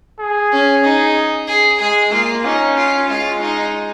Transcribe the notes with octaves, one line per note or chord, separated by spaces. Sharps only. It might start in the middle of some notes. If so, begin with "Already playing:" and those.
G#4
C#4
D#4
G#4
G#3 G#4
A#3 F4
C#4 D#4
F4
G#3 F4
D#4